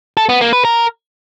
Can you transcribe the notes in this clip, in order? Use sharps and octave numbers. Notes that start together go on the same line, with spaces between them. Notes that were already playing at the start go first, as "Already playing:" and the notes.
A4
B3
A#3
B4
A#4